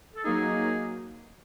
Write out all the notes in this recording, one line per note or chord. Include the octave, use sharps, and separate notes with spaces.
A4
F#3 A#3 D#4 G#4